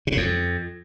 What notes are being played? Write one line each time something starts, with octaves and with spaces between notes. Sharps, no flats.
C3
C#3
F2